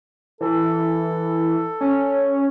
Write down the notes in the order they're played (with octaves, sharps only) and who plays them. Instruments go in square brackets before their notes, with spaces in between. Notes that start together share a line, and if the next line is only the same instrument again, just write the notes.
[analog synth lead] E3 [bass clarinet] A4
[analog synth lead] C#4